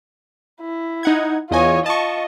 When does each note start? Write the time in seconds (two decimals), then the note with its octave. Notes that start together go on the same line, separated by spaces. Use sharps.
0.61 E4
1.03 D#4 F#5 G#6
1.51 E2 F4 C#5 D#5 G#5
1.86 F4 D#5 A5 C#6